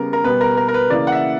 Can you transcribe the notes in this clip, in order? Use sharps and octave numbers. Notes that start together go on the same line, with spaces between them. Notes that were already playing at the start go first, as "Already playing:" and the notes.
Already playing: C#3 G3 B3 A#4
A#4
B2 G3 B3 B4
A#4
A#4
A#4
B4
C#3 E3 A#3 D5
F#5
E5